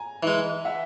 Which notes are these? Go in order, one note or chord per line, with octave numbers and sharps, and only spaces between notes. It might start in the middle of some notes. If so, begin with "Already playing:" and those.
Already playing: G#5 A#5
E3 G#3
E5 F#5